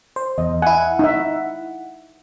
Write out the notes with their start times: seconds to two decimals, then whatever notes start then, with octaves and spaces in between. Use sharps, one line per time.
0.16 C5
0.38 E2 D#5
0.62 E4 F#5 G#5
0.99 D#4 E5